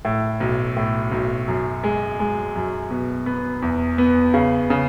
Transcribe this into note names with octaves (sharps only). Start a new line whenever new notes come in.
A2
B1
A2
B1
F#2
G#3
G#3
F#2
B2
B3
E2
B3
C#3
C#3